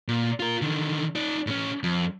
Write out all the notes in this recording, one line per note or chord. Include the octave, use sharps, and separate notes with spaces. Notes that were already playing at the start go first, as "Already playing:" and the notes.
A#2
F4 A#4
D3 D#3
D#4 D5
A2 C#4
F2